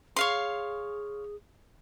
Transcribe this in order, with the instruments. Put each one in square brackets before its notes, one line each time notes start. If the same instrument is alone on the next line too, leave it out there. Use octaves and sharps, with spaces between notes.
[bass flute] G#4 [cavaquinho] C#5 F5 C6